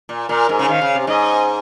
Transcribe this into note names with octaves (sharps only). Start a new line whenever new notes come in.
A#2
A#2 A#4
G#2
C#3
D#3 F5
C#3
C3
G#2 D#5